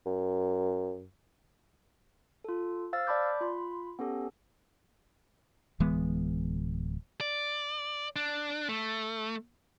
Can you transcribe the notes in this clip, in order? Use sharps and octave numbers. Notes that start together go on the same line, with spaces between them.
F#2
F4 A4
C5 F5 E6 F6 A6
D5 A5 B5 D6 G6
F4 B5 C6
B3 C#4 G4 A4
D1 E3 G#3 B3
D5
D4
A3